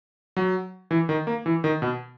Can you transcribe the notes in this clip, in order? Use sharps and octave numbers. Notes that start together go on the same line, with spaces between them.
F#3
E3
D#3
A#3
E3
D#3
B2